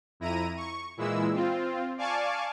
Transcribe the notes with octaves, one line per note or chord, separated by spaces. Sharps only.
F2 E4 A#5 D#7
C#6
A#2 E3 G#3 E4 E6
C4 F4
D5 F5 G#5 A5 C#6 D6